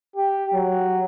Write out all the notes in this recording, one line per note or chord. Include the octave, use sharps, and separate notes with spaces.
G4
F#3